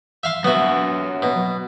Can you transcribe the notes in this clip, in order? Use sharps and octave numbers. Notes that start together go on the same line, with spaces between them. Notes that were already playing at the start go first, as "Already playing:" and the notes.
E5 F5 C6
F#3 B3 F#4 E5
B2